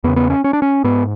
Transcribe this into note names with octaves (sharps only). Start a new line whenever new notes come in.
E2 C#3 B3
B3
C#4
C#4
D4
C#4
G#2 B3